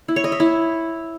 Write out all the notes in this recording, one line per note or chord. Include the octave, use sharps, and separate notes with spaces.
E4
C#5
D#5
E5
E4